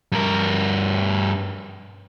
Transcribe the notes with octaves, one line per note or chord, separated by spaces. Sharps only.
G2 A#4